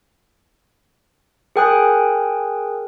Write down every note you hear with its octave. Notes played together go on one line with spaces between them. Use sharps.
G#4 A#4 G5 G#5 D#6 F#6